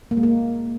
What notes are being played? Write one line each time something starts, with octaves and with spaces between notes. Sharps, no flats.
A#3
G#3
A#3